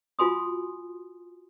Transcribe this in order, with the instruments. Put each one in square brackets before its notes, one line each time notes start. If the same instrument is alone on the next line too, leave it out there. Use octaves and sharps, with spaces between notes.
[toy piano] F4 F#4 G#5 C6 D#6